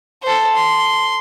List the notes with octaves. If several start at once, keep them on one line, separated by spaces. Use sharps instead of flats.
A4 C5
C6